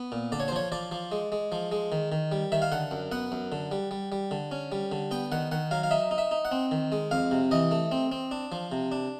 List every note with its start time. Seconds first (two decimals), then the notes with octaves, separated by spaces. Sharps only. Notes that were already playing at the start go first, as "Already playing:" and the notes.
Already playing: B3
0.12 A#2
0.32 D3 D5
0.40 C#5
0.48 C5
0.52 F3 C#5
0.72 F3 D5
0.92 F3
1.12 G#3
1.32 G#3
1.52 F3
1.72 G#3
1.92 D#3
2.12 D#3
2.32 G3
2.52 D#3 E5
2.62 F5
2.72 D3 F#5
2.91 F#2
3.12 B3 F#5
3.32 F#2
3.52 D3
3.71 G3
3.91 G3
4.12 G3
4.31 D3
4.51 C#4
4.72 G3
4.92 D3
5.11 B3 G5
5.32 D#3 F#5
5.52 D#3 F#5
5.71 F#3 F5
5.83 F5
5.91 D#4 E5
6.11 D#4
6.18 E5
6.31 D#4
6.45 F#5
6.52 C4
6.71 D#3
6.92 G#3
7.11 F2 F5
7.31 C3
7.51 E3 D#5
7.71 A3
7.92 C4
8.12 C4
8.31 D4
8.52 F3
8.72 C3
8.92 D4